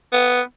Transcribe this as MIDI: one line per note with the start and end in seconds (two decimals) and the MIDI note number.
0.12 0.41 59